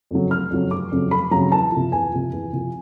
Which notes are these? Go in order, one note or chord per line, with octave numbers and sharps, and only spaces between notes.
F2 C#3 F#3
F1 F6
F2 C#3 F#3
F1 D6
F2 C#3 F#3
F1 B5
F2 C#3 F#3 A#5
E2 A5
C3 F3
E2 G#5
C3 F3
E2
C3 F3